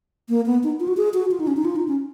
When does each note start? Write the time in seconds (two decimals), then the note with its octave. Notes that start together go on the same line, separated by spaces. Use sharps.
0.29 A#3
0.46 B3
0.63 D#4
0.80 F4
0.88 F#4
0.97 G#4
1.14 F#4
1.31 F4
1.40 D#4
1.47 C#4
1.57 D#4
1.65 F4
1.76 D#4
1.88 C#4